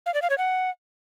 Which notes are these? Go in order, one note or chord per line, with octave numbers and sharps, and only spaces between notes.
F5
D5
F5
C#5
F#5